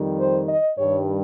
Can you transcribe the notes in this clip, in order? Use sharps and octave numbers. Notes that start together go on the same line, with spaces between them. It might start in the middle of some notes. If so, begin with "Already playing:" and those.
Already playing: F2 D#3 G3
C5
D#5
G2 D#3 G3 C#5